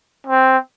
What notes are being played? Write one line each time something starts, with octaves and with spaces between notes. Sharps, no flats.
C4